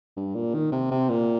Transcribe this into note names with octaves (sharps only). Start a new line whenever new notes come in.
G2
A#2
D#3
C3
C3
A#2